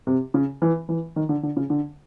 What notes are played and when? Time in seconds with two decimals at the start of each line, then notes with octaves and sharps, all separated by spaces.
0.07 C3
0.34 C#3
0.62 E3
0.89 E3
1.16 D#3
1.29 D3
1.43 D3
1.57 C#3
1.70 D3